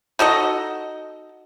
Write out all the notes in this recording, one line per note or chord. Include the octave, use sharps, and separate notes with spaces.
D#4 F#4 A4 D#5